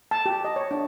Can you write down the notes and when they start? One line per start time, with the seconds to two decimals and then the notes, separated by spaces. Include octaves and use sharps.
0.11 A5
0.26 G4
0.44 D#5
0.56 C#5
0.71 D4